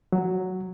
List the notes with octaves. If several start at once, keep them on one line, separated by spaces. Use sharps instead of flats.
F#3